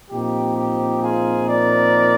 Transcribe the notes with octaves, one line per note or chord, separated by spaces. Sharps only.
A#2 F3 C4 D#4 G4
G4
F4 G#4
A#4 D5